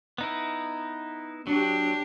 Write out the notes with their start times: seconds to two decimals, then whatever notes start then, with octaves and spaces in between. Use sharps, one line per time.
0.18 B3 D#4 E4
1.47 F#3 D4 G4